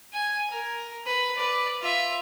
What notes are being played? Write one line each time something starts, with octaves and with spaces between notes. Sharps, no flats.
G#5
A#4
B4
B4 D5
F4 E5